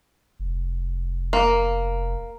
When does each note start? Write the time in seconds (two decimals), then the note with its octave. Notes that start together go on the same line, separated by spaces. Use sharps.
0.40 F1
1.33 A#3